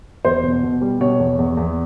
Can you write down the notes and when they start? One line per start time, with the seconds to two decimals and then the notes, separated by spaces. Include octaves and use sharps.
0.25 E2 C5
0.43 B2
0.63 B2
0.82 G3
1.00 B2 C#5
1.19 E2
1.39 E2
1.57 E2